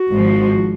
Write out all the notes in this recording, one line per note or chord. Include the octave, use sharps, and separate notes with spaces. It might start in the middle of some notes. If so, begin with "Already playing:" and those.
Already playing: F#4
G#1 G#2 F3